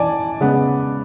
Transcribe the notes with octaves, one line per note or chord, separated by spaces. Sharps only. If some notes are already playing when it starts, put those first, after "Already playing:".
Already playing: E3 D5 G#5 A5
C#3 G#3 B3